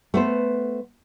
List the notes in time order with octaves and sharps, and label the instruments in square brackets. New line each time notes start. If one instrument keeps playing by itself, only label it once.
[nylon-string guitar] A3 B3 C5